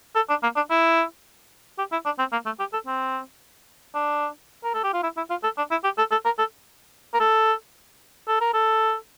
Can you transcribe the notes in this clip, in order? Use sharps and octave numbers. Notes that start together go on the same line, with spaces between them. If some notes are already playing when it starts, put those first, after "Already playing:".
A4
D4
A#3
D4
E4
G4
E4
D4
C4
A#3
A3
G4
A4
C4
D4
A#4
A4
G4
F4
E4
E4
F4
A4
D4
E4
G4
A4
A4
A#4
A4
A#4
A4
A4
A#4
A4